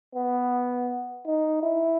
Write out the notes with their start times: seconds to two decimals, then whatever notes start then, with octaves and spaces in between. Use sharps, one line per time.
0.15 B3
1.27 D#4
1.63 E4